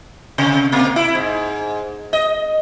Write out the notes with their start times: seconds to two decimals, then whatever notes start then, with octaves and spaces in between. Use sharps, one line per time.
0.38 C3
0.72 B2 A#3
0.96 E4
1.15 G#2
2.13 D#5